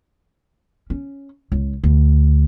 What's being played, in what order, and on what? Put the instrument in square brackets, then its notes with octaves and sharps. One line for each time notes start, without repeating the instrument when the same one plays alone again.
[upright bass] C#4
C#2
D2